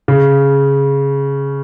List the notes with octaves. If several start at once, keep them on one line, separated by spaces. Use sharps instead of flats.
C#3